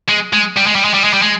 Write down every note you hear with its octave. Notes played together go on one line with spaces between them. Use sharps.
G#3
G#3
G3
G#3
G3
G#3
G3
G#3
G3
G#3